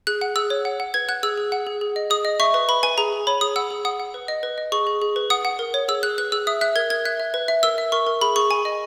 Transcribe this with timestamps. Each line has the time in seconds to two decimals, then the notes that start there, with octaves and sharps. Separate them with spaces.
0.07 G#4 F#6
0.21 F#5
0.36 G#4 E6
0.50 C#5
0.65 F#5
0.80 F#5
0.94 B4 G#6
1.09 F#5 F#6
1.23 G#4 E6
1.38 G#4
1.52 F#5
1.67 G#4
1.81 G#4
1.96 D#5
2.10 G#4 D#6
2.25 D#5
2.40 E5 C#6
2.54 B4
2.69 B4 B5
2.83 B4 G#5
2.98 G#4 A#5
3.13 G#4
3.27 C#5 B5
3.41 G#4 D#6
3.56 F#5 E6
3.71 G#4
3.85 F#5 D#6
4.00 F#5
4.14 B4
4.28 D#5
4.43 B4
4.58 D#5
4.72 G#4 C#6
4.87 G#4
5.02 G#4
5.16 B4
5.30 F#5 D#6
5.45 F#5
5.59 A#4
5.74 C#5
5.88 G#4 E6
6.03 G#4 F#6
6.18 B4 F#6
6.32 G#4 E6
6.47 E5 D#6
6.61 E5 F#6
6.76 A#4 G#6
6.90 A#4 G#6
7.05 E5 F#6
7.20 E5
7.34 B4
7.48 E5
7.63 A#4 E6
7.78 E5
7.92 A#4 C#6
8.07 A#4
8.21 G#4 B5
8.36 G#4 C#6
8.50 G#4 G#5
8.65 D#5